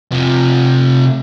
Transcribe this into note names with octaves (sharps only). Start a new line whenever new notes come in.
C3 F3